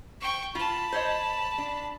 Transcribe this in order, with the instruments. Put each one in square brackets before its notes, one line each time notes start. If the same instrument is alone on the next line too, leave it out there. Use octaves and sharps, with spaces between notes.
[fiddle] G5 C#6
[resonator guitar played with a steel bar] F4 [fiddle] A5 B5
[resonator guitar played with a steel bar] C5 C#5 D#5
D4